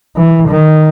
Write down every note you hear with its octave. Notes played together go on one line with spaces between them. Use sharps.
E3
D#3